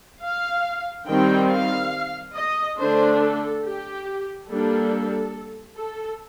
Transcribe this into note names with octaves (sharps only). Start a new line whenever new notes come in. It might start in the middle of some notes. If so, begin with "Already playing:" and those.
F5
D#3 G3 C4 G5
F5
D#5
D3 A3 D4 C5
A4
G4
G3 A#3 D4 A4
A4